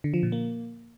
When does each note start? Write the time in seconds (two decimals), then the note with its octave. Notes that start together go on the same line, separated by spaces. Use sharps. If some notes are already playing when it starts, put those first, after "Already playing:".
0.04 D3
0.14 F3
0.23 A#2
0.32 A#3